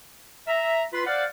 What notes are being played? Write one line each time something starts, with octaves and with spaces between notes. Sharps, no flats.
E5 A#5
F4 B4 B5 C6
C5 D5 F5 F#5